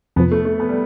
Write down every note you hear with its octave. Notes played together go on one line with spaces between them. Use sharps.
F2 C3 F3 B3
A3
A3
B3
G3